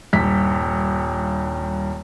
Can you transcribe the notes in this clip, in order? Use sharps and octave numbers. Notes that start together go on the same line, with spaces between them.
D#1 G2 B6